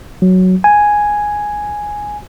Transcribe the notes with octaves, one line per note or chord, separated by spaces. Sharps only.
F#3
G#5